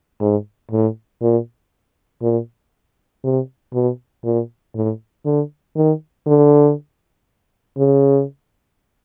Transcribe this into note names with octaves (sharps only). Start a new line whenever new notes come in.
G#2
A2
A#2
A#2
C3
B2
A#2
A2
D3
D#3
D3
C#3